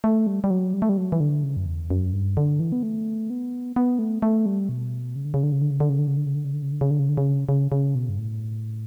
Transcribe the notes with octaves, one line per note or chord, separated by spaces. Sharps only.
A3
G3
G3
F#3
G3
A3
G3
F#3
E3
D3
C#3
F#2
E2
F#2
G2
D3
E3
B3
A3
B3
B3
A3
A3
G3
B2
C#3
D3
C#3
D3
C#3
D3
C#3
D3
C#3
D3
C#3
D3
C#3
D3
C#3
D3
C#3
D3
C#3
D3
C#3
D3
C#3
C#3
C#3
B2
G2
A2